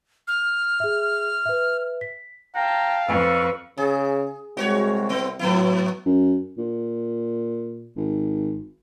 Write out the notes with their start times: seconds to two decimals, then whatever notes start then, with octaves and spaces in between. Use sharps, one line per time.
0.28 F6
0.80 G#4 E5
1.46 B4 E5
2.01 B6
2.56 F5 G5 A5 A#5
3.08 F2 A4 B4 C#6
3.78 C#3 G#4
4.57 C2 G#3 F#4 C5 C#5
5.09 B3 C4
5.39 G#2 F#3 B3 E4
6.06 F#2
6.58 A#2
7.97 G#1